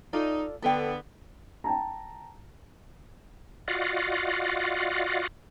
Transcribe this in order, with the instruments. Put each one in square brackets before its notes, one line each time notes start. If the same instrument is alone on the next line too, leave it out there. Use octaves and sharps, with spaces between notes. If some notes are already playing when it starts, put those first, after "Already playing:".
[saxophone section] D#4 [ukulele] F4 A4 D5
[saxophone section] D3 B3 [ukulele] A4 G5
[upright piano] G5 A5 A#5
[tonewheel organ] F4 F#4 D5 D#5 F5 F#5